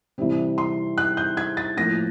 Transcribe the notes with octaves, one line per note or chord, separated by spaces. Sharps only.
C3 E3 G3 C4
C6
F#6
G6
G#6
A6
A2 F3 A#3 A#6